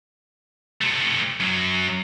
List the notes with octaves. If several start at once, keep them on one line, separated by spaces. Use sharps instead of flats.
C3 A3
F#2 F#3